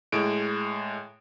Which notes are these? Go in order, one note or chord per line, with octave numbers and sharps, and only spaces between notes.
A2 G#3 D7